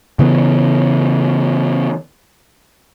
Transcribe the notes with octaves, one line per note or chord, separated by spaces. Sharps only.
C#3 E3 B3